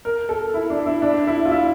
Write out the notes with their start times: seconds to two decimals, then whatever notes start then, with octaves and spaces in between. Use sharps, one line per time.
0.05 A#4
0.29 A4
0.54 E4
0.70 D4
0.86 E4
1.02 D4
1.27 E4
1.45 F4
1.51 E4